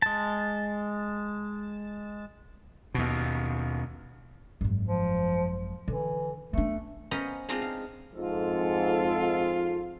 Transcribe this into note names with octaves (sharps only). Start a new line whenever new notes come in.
G#3 A5
D#2 B2
G#1 F#2
F3
D3 E3
A3 B3 D4
B3 C#4 C5 D#5 F5 A#5
G#3 C4 D4 D#4 F4 G#4
F5
F2 G#2 F4 A4